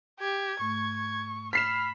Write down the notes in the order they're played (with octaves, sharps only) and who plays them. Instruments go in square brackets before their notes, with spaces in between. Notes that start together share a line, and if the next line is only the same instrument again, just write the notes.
[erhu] G4 [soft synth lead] G#6
[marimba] G#2 A3 [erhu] C#6
[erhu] C#6
[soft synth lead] B5 [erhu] F6 [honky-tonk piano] B6 C7 E7